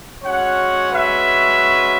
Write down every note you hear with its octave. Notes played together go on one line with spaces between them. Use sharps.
G#3 C#4 F#4 C#5 F#5
B4 E5